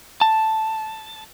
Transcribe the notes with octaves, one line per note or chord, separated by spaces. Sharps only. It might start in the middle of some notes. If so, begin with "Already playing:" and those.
A5